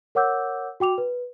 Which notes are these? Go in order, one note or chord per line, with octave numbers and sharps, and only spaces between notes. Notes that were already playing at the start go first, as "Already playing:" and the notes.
A#4 C#5 F#5 D6 E6 G6
F#4 G5 D6 F7
B4